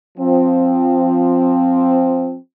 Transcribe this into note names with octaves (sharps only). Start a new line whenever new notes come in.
F3 C4